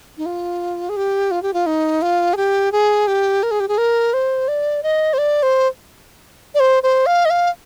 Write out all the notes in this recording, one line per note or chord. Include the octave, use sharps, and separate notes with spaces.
D#4
F4
G#4
G4
F4
G4
F4
D#4
F4
G#4
G4
G#4
G4
A#4
G#4
G4
G#4
A#4
C5
D5
D#5
C5
D5
C5
D5
C5
C5
F5
D#5
F5